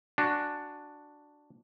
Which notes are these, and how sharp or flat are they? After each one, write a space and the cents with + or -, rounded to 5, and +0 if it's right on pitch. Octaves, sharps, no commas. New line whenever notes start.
D4 +5 F#4 +0 G#5 +0